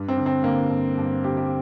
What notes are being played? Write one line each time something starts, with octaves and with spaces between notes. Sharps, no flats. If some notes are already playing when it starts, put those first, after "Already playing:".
Already playing: G2
C4
D3
C4
D3 A#3
G2
G2
D3 G4
G4